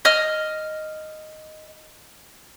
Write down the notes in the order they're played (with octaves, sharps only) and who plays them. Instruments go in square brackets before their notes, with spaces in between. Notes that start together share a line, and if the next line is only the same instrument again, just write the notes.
[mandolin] D#5 F6